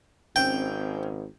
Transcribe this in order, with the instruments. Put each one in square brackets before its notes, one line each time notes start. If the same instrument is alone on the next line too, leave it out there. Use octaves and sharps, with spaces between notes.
[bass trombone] G#1 [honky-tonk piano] C4 C#4 [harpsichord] G5